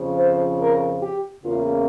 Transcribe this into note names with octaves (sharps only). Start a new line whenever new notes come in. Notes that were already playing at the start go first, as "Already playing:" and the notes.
Already playing: F2 C#3 F3
C5
A#4
G4
E2 C#3 E3 A#3 C#4 F4